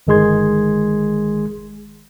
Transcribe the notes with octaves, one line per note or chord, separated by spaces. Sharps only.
G1 D#3 G#3 G#4 C6 G#6